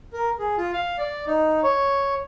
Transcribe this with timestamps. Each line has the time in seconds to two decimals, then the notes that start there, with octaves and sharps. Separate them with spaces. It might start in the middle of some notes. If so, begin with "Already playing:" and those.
0.13 A#4
0.39 G#4
0.58 F4
0.73 F5
0.98 D5
1.27 D#4
1.63 C#5